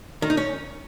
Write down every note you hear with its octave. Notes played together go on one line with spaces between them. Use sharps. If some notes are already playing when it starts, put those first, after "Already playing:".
D#3
D#4
C#4